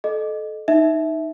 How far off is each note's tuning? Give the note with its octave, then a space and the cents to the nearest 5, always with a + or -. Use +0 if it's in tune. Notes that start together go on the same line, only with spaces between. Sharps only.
A4 -20 D#5 -20
D#4 +0 E5 -10